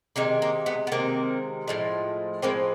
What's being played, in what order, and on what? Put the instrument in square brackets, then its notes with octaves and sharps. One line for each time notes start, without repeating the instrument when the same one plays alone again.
[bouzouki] C3 D#3 G#3 A#3
A#3
A3 B3
B3
C3 D#3 G#3 A#3 C4
A2 F3 G#3
A2 F3 G#3 A#3 C4